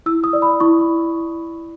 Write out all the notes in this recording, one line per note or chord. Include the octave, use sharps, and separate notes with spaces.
E4 E6
D#6
D5
B5
E4 C#6